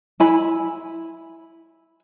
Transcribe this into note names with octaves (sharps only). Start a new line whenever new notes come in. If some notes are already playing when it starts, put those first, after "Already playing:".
E4 G#5 B5